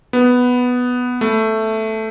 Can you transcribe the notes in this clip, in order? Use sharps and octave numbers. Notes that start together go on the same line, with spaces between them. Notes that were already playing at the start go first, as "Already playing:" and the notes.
B3
A3